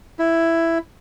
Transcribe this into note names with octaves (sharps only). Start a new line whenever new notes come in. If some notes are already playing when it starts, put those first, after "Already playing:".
E4